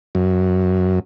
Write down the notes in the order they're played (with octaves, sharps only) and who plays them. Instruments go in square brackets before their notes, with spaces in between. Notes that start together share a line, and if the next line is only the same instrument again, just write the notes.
[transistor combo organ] F#2